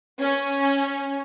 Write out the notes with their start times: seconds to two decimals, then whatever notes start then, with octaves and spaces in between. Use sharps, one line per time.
0.21 C#4